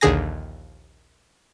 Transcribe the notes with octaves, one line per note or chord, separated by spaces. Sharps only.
A#1 D#2 D3 G#4 G#5 A#6